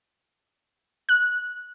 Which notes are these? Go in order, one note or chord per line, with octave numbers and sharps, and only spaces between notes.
F#6